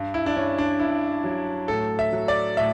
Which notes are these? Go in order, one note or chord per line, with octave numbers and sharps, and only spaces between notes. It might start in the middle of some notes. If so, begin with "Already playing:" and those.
Already playing: G2
E4
D4
G2 C#4
D4
G2 E4
F#3
A2 A4
E5
F#3
D5
A2 E5